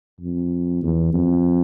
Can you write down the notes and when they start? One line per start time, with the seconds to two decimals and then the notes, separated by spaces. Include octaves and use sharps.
0.21 F2
0.83 E2
1.14 F2